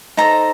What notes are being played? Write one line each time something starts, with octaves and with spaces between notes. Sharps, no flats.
D#4 A4 C5 A#5